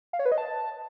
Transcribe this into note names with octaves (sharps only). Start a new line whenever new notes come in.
F5
C#5
B4
D#5
A5